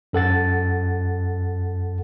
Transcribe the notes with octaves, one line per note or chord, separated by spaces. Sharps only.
F#2 A4 F#5 A6